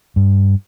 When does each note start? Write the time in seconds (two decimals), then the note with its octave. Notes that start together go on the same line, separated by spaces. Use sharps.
0.16 G2